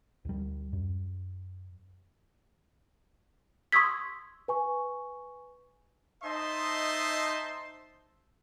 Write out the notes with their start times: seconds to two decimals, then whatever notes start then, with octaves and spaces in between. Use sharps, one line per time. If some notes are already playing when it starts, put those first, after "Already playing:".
0.25 D2 G3
0.73 F#2
3.72 C6 C#6 D#6 E6 G#6 B6
4.48 B4 G#5 C#6
6.23 D#4 C5 D#5 E5 A5 C6